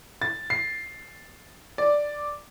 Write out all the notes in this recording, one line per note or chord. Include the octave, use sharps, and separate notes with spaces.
A6
C7
D5